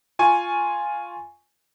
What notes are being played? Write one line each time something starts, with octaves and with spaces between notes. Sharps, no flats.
F4 G#5 C#6